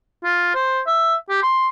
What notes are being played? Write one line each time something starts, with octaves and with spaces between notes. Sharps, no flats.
F4
C5
E5
G4
C6